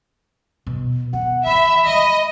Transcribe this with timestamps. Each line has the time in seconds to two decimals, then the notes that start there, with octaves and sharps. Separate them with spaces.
0.67 B2
1.13 B3 F#5
1.46 E3 E5 B5
1.87 G#3 D#5